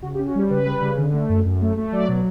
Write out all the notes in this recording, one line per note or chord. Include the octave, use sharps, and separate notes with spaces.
C#3 F#4
G4
C#4
F#4
G3 G4
C#3 B4
G3
C#3
D3
A3
F#2
F#2
A3
A3
F#3 D5
B2